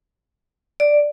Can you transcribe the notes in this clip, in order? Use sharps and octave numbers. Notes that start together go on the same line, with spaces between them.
D5